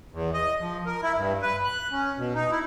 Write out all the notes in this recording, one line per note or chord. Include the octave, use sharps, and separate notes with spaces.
E2
D#5
F3
A#4
E4
G2
B4
F#6
C#4
B2
D#4
E4